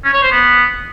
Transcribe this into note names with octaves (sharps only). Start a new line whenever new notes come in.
C#4
C#5
C5
B3